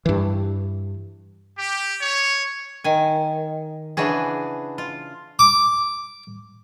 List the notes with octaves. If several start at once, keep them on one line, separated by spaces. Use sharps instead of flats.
G2 E3
G4
C#5
D#3 G#5
C#3 E3 D4 F#4 G#4
F4
D6